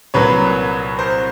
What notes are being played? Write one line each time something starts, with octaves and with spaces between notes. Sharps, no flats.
C2 A#2 F#3 A#3 B4 C#5
A#4 C5